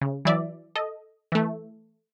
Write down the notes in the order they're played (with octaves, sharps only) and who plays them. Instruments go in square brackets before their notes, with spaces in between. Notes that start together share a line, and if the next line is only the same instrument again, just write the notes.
[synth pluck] C#3
E3 F#3 E4 D5 E5
A4 D#5
E3 A3